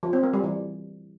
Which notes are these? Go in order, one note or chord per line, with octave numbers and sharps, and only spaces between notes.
F3
C4
A#3
G3
E3